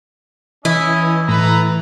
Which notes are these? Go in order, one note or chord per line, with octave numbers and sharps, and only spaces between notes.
E3 C#4 E4 D#5
A2 A4 B4 A#5